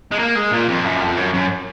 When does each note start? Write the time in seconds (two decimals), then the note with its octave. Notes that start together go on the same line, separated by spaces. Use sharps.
0.12 G#3
0.19 A#3
0.36 G#3
0.52 A#2
0.68 F2
0.85 F#2
1.01 F2
1.17 F#2
1.34 F#2